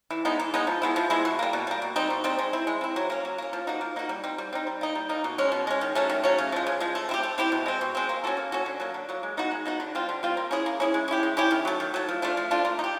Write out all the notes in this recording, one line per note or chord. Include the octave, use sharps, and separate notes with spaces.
E3
G#3 B3 D#4
E3
G#3 B3 D#4
F3
G#3 B3 E4
F3
G#3 B3 E4
B2
G3 A#3
B2
G3 A#3
B2
G3 C4 D#4
B2
G3 C4 D#4
G#3
C4 E4
G#3
C4 E4
F#3
A#3 C#4
F#3
A#3 C#4
F3
A#3 D#4 F#4
F3
A#3 D#4 F#4
G3
C4 D#4
G3
C4 D#4
G3
A#3 D#4
G3
A#3 D#4
B2
G#3 C#4
B2
G#3 C#4
D#3
F#3 A3 C#4
D#3
F#3 A3 C#4
C#3
F3 G#3
C#3
F3 G#3
A3
C4 E4 G4
A3
C4 E4 G4
B2
G#3 C4
B2
G#3 C4
A#3
C#4 F#4 A4
A#3
C#4 F#4 A4
D3
F#3 A#3
D3
F#3 A#3
G#3
B3 D#4 F#4
G#3
B3 D#4 F#4
D3
G3 C4 F4
D3
G3 C4 F4
A#3
C#4 E4 G#4
A#3
C#4 E4 G#4
G#3
C#4 E4 G4
G#3
C#4 E4 G4
D#3
F#3 A3
D#3
F#3 A3
F3
A3 D4 F4
F3
A3 D4 F4
A#3
D#4
G4